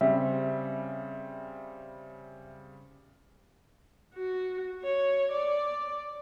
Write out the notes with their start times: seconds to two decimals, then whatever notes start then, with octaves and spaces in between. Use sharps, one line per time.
0.01 C#3 G3 C4 E5
4.14 F#4
4.83 C#5
5.32 D5